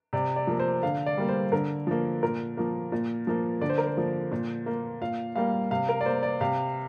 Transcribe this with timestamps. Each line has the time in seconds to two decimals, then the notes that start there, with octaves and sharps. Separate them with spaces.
0.13 C3 D5
0.36 D5
0.47 F3 A#3
0.60 C5
0.83 D3 F5
1.06 D5
1.18 G3 A#3
1.29 C5
1.52 D3 A#4
1.87 F3 A#3
2.23 A#2 A#4
2.57 F3 A#3
2.92 A#2
3.27 F3 A#3
3.61 D3 D5
3.70 C5
3.78 A#4
3.87 C5
3.97 F3 A#3
4.32 A#2
4.66 A#3
5.02 A#2 F5
5.36 G3 A#3 F5
5.71 C3 F5
5.89 A#4
6.01 D5
6.06 A#3 C5
6.23 D5
6.41 C3 F5